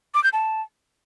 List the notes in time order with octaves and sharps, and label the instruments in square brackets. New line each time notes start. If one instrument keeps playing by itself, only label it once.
[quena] D6
G6
A5